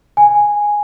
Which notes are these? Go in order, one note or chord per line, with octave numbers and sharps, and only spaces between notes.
G#5